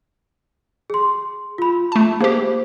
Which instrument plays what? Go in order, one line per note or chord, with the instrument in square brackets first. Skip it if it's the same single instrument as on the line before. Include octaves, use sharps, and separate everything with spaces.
[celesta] G#4 C6
F4 B5
[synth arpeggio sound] A3 A5
[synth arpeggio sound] A#3 G4 [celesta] G#4 C5